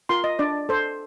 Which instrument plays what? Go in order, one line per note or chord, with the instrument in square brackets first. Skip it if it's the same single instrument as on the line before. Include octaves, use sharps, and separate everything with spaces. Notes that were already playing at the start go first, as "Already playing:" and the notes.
[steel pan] F4 A#4 C6
D#5
D4 D5
A4 C5